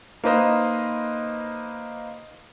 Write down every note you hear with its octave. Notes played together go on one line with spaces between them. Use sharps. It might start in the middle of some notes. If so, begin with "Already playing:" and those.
A#3 D#4 B4 C5 D#5